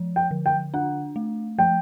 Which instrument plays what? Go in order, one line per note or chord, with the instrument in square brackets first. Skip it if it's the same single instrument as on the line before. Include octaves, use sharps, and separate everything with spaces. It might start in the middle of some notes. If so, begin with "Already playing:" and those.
Already playing: [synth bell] F3
[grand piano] G5
[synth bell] D3
[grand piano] G5
[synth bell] D4 [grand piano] F#5
[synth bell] A3
[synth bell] F3 [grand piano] G5